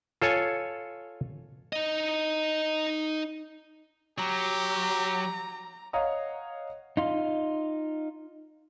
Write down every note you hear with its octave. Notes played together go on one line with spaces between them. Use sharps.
F4 A4 C#5 G#5
D#4 D#5
F#3 G4 A#5
C#5 D#5 F5 F#5 A#5 D#6
D#4 F4